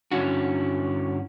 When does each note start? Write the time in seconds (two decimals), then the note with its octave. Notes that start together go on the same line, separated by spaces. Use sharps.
0.11 G2 D3 C#4 E4 F#4